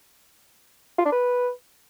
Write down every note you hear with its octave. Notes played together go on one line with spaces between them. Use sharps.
F4
D4
B4